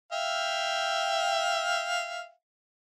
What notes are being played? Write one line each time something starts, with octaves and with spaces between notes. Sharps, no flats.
E5 F5 G5